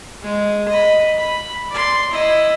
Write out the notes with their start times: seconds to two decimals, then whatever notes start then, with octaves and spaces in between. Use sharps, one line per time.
0.23 G#3
0.69 D#5 B5
1.17 B5
1.71 D5 C6
2.11 E4 D#5